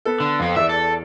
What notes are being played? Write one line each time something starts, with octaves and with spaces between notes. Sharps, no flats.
B3 A4
D3
F2 C4
E2 D5 E5
A4